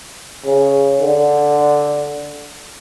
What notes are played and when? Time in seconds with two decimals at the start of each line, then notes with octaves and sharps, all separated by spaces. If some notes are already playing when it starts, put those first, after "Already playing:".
0.45 C#3
1.01 D3